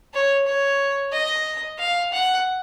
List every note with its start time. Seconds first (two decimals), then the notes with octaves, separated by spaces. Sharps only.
0.14 C#5
0.47 C#5
1.13 D#5
1.79 F5
2.13 F#5